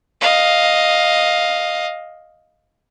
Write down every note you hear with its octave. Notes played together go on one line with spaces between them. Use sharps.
D#5 F5